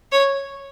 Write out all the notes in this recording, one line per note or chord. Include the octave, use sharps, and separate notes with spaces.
C#5